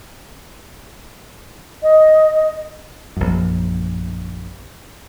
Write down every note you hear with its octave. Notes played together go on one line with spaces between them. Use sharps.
D#5
A#1 F#2